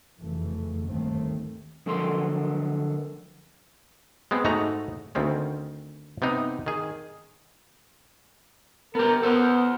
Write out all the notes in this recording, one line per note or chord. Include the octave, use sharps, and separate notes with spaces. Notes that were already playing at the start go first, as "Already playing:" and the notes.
F1 F#2 C#3 E3 A3
G1 D#2 G#2 D#3 A3 C4
D3 F3 F#3 A4 A#4 C6
G#3 B3 C4
G#2 A3 D#4 F#4 A#5
D2 D#3 C4 C#4
C3 B3 C4 D#4
D#3 G#4
B3 G4 A#4
B3 A4 C5